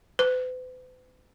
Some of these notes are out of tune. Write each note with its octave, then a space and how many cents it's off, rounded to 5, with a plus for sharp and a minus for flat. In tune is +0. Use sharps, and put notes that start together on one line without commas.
B4 +45